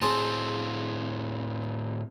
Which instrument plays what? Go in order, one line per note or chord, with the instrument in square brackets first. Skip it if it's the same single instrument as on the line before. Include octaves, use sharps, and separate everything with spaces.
[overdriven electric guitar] A2 C4 [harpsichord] G#4 C5 A5